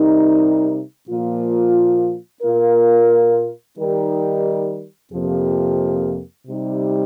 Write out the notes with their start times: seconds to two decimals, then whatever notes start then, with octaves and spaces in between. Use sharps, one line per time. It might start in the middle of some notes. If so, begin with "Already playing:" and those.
Already playing: C3 G3 D#4 A#4
1.08 A#2 F3 A#3 F4
2.43 A#2 A#3 F4 A#4
3.78 D#3 G3 D#4 G4 A#4
5.12 F2 C3 F3 A#3 G4
6.47 C3 G3 D#4